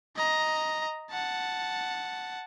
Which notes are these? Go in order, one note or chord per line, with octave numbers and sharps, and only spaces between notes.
D#5 A#5
F#5 A5